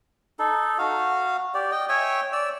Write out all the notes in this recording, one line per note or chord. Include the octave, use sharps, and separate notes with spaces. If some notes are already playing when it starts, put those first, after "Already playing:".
D#4 A4
F#4 F5
G4 D5
D#5 G5
C#5 E5 G5 G#5
D5 E6